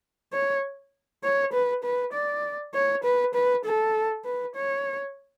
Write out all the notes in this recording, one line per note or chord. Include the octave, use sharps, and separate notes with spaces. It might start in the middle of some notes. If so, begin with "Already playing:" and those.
C#5
C#5
B4
B4
D5
C#5
B4
B4
A4
B4
C#5